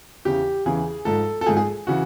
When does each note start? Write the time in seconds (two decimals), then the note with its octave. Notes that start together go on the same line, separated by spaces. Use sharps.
0.25 E2 C#3 E3 G4
0.65 E2 C#3 E3 G#4
1.05 G#2 F3 A4
1.41 A4
1.46 G#2 F3 G#4
1.57 G#4
1.87 C#3 E3 F#4